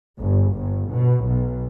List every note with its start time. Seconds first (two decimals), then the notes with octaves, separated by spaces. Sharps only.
0.19 G1
0.54 G1
0.91 B2
1.25 B1